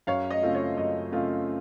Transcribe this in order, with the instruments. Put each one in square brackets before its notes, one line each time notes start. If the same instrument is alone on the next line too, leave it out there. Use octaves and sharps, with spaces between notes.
[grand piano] F#2 [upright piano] C#5 F5
[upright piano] D#5
[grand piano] C#3 A3 C4 F4
[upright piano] C#5
[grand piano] F#2 [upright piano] D#5
[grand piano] C#3 A3 C4 F4